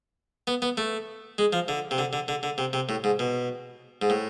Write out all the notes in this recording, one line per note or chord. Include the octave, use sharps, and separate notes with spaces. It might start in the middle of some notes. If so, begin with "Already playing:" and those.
B3
B3
A3
G#3
F3
D3
C3
D3
D3
D3
D3
C3
C3
A2
G#2
B2
G#2
A2